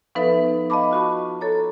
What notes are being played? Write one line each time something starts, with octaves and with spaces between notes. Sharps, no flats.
F3 B3 D#4 A4 B4 E5
D#5 F5 A5 B5 D6
F4 F#4 B5 C#6
A4 C#5 A#5